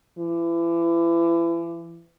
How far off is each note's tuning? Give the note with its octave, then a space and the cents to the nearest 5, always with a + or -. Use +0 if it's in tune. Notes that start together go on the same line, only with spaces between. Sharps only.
E3 +35